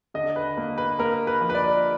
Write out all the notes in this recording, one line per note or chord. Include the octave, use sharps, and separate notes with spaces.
D3 D#5
B4
A#3
B4
A#3 A#4
B4
F3
B4
D5